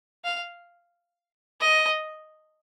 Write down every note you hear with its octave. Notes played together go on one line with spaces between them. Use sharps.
F5
D#5